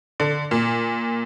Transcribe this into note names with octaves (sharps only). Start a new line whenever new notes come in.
D3
A#2